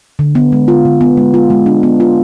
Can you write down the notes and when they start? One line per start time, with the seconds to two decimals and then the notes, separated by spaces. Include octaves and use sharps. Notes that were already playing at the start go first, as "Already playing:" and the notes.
0.19 D3
0.35 B3
0.52 G#3
0.68 F4
0.85 D3
1.01 B3
1.17 G#3
1.34 F4
1.50 G#3
1.66 D4
1.83 B3
2.00 F4